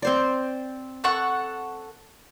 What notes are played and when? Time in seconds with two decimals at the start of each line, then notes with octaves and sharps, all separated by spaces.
0.02 C4 C5 D5
1.04 A4 F#5 C#6